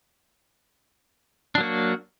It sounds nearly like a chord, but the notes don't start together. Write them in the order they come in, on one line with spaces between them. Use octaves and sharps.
D4 F#3 A#3 F#4